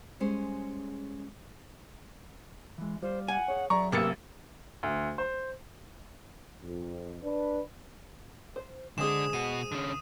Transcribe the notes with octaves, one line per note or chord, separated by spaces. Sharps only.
G3 G#3 C#4 G#4 C5
E3 G#3
G3 F4 C5
F#5 G#5
G#4 C#5
F#3 G#4 D5 E5 A#5 C#6
A1 C3 A#3 E6 A6 C#7
D2
C5
F2
D4 B4
C5
D3 G#3 C4 G#4 D#6 E7
B2 F#4 D#7
D3 C#4